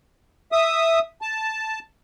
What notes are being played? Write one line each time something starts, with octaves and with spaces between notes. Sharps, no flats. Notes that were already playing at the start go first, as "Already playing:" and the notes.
E5 D#6
A5